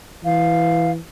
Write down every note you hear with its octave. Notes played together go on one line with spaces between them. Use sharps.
E3 F5